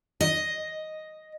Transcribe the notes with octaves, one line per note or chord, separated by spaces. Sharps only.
D#5